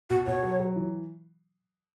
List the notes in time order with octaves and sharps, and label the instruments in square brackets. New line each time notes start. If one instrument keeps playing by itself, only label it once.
[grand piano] B2 [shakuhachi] F#4
[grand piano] B2 [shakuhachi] C#5
[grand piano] F#3
F#3
E3